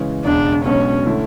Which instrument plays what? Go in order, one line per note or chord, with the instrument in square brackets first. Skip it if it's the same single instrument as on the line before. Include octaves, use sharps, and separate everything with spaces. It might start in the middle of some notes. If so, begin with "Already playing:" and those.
Already playing: [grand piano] C#3 E3 G#3 C#4
[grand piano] E1 E2 C#3 G#3 [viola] D4
[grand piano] B1 B2 G#3 D4 [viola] C#4
[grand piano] D3 A3 E4